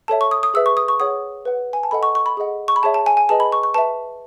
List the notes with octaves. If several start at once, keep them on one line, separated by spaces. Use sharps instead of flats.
A4 C#5 E5 A5
C#6
D#6
D#6
G#4 B4 E5 E6
C#6
D#6
C#6
G#4 C#5 F#5 D#6
B4 F#5
G#5
A5
A4 D#5 F#5 B5
C#6
C#6
B5
G#4 D#5 F#5
C#6
B5
G#4 C#5 E5 A5
A5
G#5
G#5
G#4 B4 D#5 A5
B5
C#6
C#6
B4 E5 A5